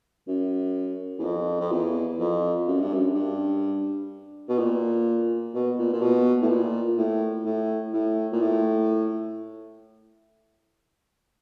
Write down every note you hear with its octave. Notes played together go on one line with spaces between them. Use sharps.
F#2
E2
F2
F2
E2
F2
F#2
G2
F#2
G2
B2
A#2
B2
A#2
A#2
B2
A2
A#2
A2
A2
A2
A#2
A2